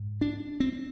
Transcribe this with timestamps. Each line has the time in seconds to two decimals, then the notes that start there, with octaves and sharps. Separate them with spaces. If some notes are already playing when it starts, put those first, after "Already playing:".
Already playing: G#2
0.21 D4
0.60 C4